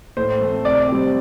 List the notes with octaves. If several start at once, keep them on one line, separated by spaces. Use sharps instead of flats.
A2 C5
A3 C4
C3 D5
G3 C4